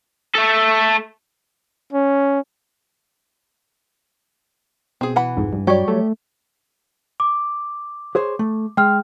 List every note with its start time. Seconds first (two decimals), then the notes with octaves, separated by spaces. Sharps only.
0.35 A3 A4
1.93 C#4
5.01 B2 C4 G#4
5.16 E3 F#5 B5
5.36 C2 F2 G#2
5.53 G2
5.67 F#3 G3 G4 C#5 D5
5.88 A3
7.20 D6
8.15 G#4 C5 C#5
8.39 A3
8.77 G#3 G5 F6